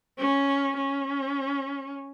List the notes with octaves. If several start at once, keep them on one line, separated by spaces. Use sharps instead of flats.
C#4
C#4